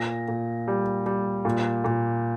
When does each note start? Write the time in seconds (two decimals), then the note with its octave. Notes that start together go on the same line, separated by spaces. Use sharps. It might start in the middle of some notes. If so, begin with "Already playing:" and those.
Already playing: A#2 A#6
0.28 A#2
0.68 G3
1.06 G3
1.45 A#2
1.84 A#2